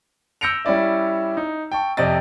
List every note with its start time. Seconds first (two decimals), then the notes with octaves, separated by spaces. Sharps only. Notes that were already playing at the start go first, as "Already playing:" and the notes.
0.41 E6 G6 A#6 C#7 D7 F7
0.65 G3 C#4 E4 D5 E5
1.37 D#4
1.72 G5 A5 C#6
1.97 F2 C3 D5 D#5 A6